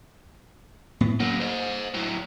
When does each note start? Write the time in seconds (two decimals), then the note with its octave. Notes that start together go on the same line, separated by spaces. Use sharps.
1.01 A2 B3
1.20 C#3 F#3 A#3
1.41 C5 D#5
1.94 A2 F#3